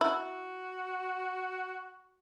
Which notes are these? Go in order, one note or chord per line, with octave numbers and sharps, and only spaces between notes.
E4 F#4